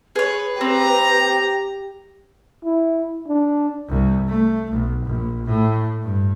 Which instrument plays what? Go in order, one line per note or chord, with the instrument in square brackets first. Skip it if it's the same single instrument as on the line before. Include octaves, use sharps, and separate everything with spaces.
[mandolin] G#4 C#5 [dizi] B4
[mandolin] C4 [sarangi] G4 [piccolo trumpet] A#5
[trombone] E4
D4
[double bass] C2
A3
B1
A#1
A2
G2